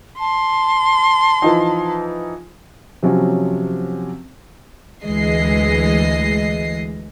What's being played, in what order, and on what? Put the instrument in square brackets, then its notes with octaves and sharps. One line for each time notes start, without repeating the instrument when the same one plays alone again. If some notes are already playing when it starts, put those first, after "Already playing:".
[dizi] A5 [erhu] C6
[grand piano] E3 F3 D#4
[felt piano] C3 F3 F#3 C#4
[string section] D2 E3 G#3 D#5 C7